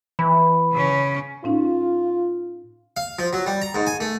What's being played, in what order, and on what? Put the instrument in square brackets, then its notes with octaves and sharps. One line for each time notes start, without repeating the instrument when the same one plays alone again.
[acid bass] E3 [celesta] B5
[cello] C#3 C#4
[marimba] A2 C#4 D#4 [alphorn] F4
[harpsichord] F5
F3
F#3
G3
A#5
G#2
G#5
A3